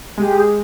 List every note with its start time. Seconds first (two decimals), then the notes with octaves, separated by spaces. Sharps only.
0.18 G#3 G4
0.38 G#4